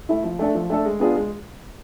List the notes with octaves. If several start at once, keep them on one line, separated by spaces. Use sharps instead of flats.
A3 E4
F3
A3 D4 A4
F3
A3 D4 A4
G#3
B3 D4 F4 G#4
G#3